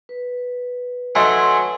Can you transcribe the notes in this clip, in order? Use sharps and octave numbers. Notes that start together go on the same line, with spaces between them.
B4
F#3 A3 D#4 G#5 C6